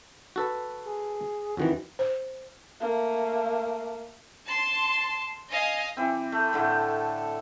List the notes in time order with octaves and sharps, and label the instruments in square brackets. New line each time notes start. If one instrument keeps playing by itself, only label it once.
[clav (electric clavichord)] F#4 A4 B4
[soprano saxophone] G#4
[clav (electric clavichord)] F2 D#3 E3 [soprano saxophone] F#4
[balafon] C5
[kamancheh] A3 A#3
[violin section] A5 C6
D#5 F5 G#5
[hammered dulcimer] E3 C4
A3
A2 D3 A3